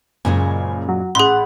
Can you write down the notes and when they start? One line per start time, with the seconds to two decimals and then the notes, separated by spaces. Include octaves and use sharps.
0.25 F#1 F#2 A#2 C#3 G#3 G#5
0.89 F#3
1.15 A1 G#4 F#5 B5 C6 F#6